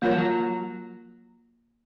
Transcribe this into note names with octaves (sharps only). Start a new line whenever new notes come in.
F#3 A#3 F4 A#4 C#5
F3
F#3